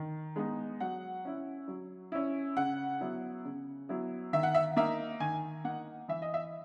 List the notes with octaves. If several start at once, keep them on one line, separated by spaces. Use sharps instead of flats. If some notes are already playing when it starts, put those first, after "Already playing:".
Already playing: D#3
G#3 B3 D#4
F#3 F#5
C#4 E4
F#3
C#4 E4
C#3 F#5
F#3 B3 E4
C#3
F#3 B3 E4
D#3 E5
F#5
E5
A#3 D#4 E5
D#3 G#5
A#3 D#4 F#5
E3 E5
D#5
E5